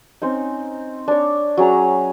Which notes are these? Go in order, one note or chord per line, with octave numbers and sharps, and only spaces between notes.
C4 C#4 D#4
D4 C#5
F#3 C#4 G#4 A#5